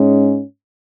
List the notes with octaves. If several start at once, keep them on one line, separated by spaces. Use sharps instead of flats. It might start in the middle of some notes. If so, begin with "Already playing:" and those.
Already playing: G#2 G#3 C#4